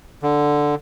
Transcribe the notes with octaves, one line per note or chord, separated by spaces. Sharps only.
D3